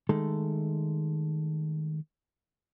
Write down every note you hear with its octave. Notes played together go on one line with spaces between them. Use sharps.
D#3 G#3 A3 A4